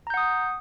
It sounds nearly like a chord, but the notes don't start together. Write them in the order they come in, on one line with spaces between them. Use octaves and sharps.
A#5 G6 F#5 D#6